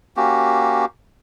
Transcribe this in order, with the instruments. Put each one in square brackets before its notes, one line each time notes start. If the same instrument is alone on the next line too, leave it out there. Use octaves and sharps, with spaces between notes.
[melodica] A#3 C#4 F#4 G4